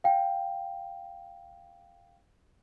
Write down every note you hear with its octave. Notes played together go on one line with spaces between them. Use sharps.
F5 G5